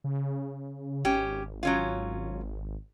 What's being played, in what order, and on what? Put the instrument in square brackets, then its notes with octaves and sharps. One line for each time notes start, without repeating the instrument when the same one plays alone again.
[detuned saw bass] C#3
[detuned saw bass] G#1 [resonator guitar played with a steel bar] C#4 G4
[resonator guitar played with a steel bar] F#3 C#4 F4